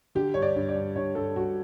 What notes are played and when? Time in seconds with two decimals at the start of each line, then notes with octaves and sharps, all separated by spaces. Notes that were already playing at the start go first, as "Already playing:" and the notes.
0.15 D3 G4
0.34 G2 C#5
0.42 D5
0.56 G2
0.69 D5
0.75 G2
0.96 G2 C#5
1.15 G2 A4
1.36 G2 F#4